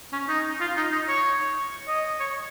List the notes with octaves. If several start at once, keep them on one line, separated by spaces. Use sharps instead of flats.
C#4
D#4
F4
D#4
D#4
C#5
D#5
C#5